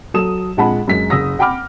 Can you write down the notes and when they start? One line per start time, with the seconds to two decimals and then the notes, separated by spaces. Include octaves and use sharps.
0.14 F#3 A4 D#6 E7
0.57 A#1 F3 G#3 F#5 A5 B5
0.87 F#2 G#3 B6
1.10 F#1 G#4 D#6 E6 A#6
1.39 F#5 G5 B5 D6 F6